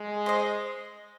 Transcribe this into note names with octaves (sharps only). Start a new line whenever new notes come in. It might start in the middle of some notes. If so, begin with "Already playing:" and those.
Already playing: G#3
C5 D#5